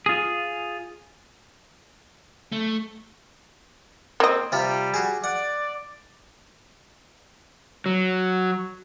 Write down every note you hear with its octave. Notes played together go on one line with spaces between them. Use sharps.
F4 G#4
A3
A#3 C4 D#5
C3 G3 F4 B5
F#4 G#4
D5 F#5
F#3